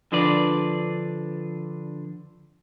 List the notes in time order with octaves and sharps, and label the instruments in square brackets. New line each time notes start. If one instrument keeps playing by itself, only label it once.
[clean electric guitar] D3 F3 D4 B4 D5